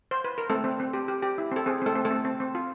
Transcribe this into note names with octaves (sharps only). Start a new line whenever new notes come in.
C5
B4
A#4
A3 C4 A4
C4
C4
G4
G4
G4
E4
C4 A4
C4 G#4
A3 C4 A4
C4
A3 A4
C4
C4
C4
F4